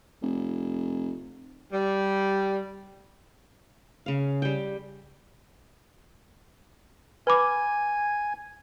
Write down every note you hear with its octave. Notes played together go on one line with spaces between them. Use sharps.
F1
G3
C#3 F5
G3 G5
B4 G#5 B5 D6